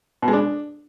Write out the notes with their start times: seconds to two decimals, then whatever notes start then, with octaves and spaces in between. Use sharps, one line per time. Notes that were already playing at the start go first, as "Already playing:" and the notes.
0.22 B2
0.28 G#3
0.33 D4